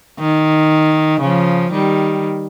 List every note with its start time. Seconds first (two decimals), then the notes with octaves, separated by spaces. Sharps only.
0.19 D#3
1.21 C#3 F3
1.71 D#3 G3